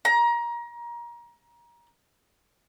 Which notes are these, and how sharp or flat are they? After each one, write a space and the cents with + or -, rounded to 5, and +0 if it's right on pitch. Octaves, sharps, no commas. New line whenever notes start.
A#5 +25